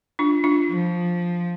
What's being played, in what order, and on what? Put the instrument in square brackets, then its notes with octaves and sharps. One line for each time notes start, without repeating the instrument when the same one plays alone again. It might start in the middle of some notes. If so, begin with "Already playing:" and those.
[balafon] D4 F4
D4 F4
[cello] F3